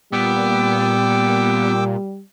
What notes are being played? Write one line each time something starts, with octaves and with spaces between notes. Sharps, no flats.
A#2 G3 B3 G5 D6 E6